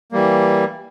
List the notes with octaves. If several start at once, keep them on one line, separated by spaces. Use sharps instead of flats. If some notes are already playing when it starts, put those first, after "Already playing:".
E3 G3 A#3